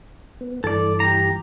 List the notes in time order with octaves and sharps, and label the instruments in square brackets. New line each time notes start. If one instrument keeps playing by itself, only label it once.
[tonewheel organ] B3
[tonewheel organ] G2 E3 [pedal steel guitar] A4 D5
[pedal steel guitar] G4 A#5